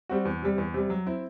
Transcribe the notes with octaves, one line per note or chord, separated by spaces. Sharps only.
G3 C4 F#4
E2
C3 G3
E2
C3 G3
F#3
C4 E4